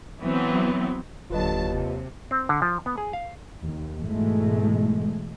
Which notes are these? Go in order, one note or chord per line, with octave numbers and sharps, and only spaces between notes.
E3 F#3 B3 C4
F1 D#2 D3 F#3 F4 B4 D#5 A5
C3
C4
D3
F3
B3
G#4
F5
D#2
G#2 B2 E3 G#3 A3